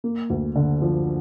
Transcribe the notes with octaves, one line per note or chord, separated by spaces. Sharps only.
A#3
D2
D3
F3